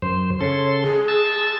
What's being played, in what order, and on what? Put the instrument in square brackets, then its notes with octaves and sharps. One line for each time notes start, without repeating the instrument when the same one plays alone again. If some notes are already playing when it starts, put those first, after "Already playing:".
[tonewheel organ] F#2 C5
[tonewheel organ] C#3 A4 C6 [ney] C#5
[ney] G#4
[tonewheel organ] A5 E6